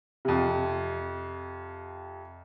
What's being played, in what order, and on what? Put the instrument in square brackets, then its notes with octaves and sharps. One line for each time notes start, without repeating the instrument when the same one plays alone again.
[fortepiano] F2 C3